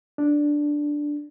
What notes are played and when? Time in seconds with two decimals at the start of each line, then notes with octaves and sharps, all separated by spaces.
0.18 D4